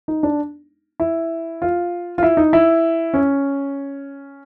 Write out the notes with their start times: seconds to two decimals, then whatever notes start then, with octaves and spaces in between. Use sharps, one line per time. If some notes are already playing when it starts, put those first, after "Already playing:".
0.08 D#4
0.23 D4
1.00 E4
1.62 F4
2.18 F4
2.23 E4
2.37 D#4
2.53 E4
3.14 C#4